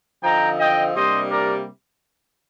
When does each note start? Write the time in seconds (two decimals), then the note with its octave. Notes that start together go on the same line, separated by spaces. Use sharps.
0.23 D3 F3 C4 D#4 G5 A#5
0.59 D#5 G5
0.95 C3 G3 A#3 D4 C5 D#5
1.31 A#4 D5